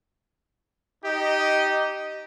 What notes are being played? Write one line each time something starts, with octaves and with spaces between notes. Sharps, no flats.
D#4 G4 D#5